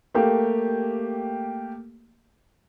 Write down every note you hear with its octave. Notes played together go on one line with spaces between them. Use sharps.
A3 A#3 G4